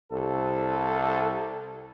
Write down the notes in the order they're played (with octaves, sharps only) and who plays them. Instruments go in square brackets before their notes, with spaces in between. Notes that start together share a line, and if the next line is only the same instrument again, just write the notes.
[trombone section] C2 A4